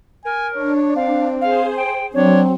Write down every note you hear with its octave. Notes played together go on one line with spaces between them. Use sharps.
A#4 G#5
D4 C#5
C4 F5
G#4 C5 F5
G5
F#3 C4 D4 C#5